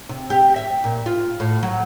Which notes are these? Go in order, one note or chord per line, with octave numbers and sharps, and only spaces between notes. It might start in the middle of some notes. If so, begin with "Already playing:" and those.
C3
G4
E5
A#2
F4
A2
F#3